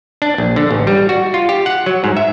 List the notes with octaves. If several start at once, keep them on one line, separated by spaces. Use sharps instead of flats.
D4
A#1
D3
A1
G3
F#4
F4
G4
F#5
F#3
G#2
E5